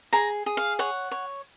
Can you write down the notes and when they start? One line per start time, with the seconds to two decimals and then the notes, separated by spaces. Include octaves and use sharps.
0.13 G#4 A#5
0.46 G#4
0.57 F5
0.79 C#5 F#5
1.11 C#5